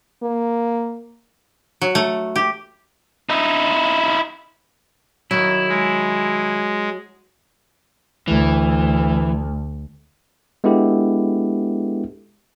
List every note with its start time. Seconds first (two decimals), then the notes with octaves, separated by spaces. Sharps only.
0.23 A#3
1.81 F#3
1.95 A3
2.36 G4
3.30 D#4 E4
5.31 D#3 F#3 E4
5.69 G#3
8.28 D2 E3
10.64 G#3 B3 D4 E4 G4 A4